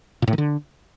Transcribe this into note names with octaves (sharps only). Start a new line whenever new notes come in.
A#2
A2
D#3
D3